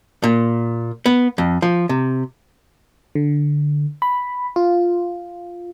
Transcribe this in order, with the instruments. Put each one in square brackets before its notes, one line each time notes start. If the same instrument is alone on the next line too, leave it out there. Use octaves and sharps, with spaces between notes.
[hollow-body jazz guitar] A#2
B3
F2
F3
C3
[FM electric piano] D3
B5
F4